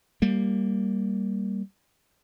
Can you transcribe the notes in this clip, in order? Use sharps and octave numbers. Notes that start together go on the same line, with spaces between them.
G3 A#3